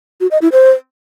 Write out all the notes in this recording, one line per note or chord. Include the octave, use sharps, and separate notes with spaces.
F#4
D#5
E4
C5